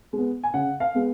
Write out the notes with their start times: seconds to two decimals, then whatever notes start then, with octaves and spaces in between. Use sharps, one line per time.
0.13 G#3 B3
0.43 G#5
0.54 C#3 F#5
0.80 F5
0.95 G#3 B3